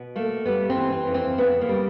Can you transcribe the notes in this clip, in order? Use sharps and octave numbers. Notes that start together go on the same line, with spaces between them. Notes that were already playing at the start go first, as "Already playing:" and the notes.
Already playing: B2
A3 A#3
G3 B3
C4
E3
C4
F2
C4
C#3 B3
A#3
G3